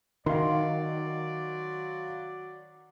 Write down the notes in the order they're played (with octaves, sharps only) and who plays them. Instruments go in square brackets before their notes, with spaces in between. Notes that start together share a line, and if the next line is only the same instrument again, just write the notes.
[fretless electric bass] D#3 [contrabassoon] F#3 [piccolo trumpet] D5 [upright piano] F5 C6